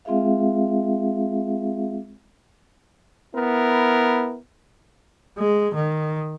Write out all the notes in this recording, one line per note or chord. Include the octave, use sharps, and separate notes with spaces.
G#3 C4 F4 G#4 E5 F5
B3 E4 A#4
G#3
D#3